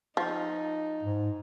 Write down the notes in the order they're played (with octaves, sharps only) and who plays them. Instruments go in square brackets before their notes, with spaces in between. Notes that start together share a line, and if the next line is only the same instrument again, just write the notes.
[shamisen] F3 [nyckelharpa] D#4
[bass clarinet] G#2